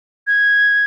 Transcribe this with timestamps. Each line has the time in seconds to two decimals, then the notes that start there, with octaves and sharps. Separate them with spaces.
0.27 G#6